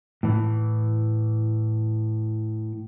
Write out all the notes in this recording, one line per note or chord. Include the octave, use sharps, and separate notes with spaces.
A2 E3